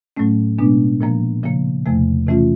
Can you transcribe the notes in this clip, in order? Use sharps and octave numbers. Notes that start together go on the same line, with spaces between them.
A2 F#3 A3 C#4
B2 G#3 B3 D4
A#2 F3 A#3
C#3 F3 A#3
E2 C3 F3 A3
C3 E3 A3 C#4 F4